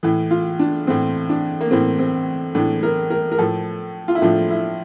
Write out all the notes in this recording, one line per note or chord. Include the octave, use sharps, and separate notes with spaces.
A2 E3
F4
D4
A2 E3 C4
D4
A#3
A2 E3 C4
C4
A2 E3 D4
A#4
A#4
A#4
A2 F3 A4
F4
E4
A2 F3 D4
E4